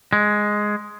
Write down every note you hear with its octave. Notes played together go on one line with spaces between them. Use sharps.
G#3